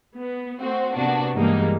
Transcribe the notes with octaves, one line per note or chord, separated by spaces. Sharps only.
B3
A3 C4 F#4 C5
C3 A#3 B3 D4 F#4
G2 E3 G3 G#3 A#3 D#4